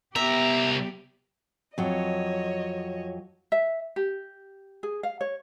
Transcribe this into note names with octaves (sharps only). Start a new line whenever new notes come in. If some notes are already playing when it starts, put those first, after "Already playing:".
C2 B3 G4 E5 A#5
F2 F#3 C#5 D#5
E5
G4
G#4
F5
C#5